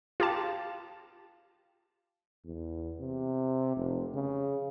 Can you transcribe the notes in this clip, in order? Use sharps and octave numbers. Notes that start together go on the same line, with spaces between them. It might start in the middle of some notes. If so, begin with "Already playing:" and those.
F4 G4 A5
E2
C3
F1
C#3